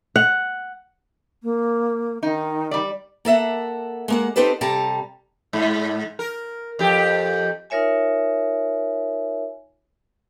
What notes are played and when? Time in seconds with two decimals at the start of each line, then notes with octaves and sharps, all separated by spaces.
0.16 F#5
1.43 A#3
2.23 D#3 D#4
2.71 G3 D5
3.25 A#3 A4 E5 F#5
4.08 G#3 A#3 F#5
4.36 C4 D#4 G4 A4 B4 C5
4.61 C3 G3 A4 A5 A#5
5.53 G#2
6.19 A#4
6.79 F2 G4
7.70 D#4 F4 A#4 C#5 E5 G#5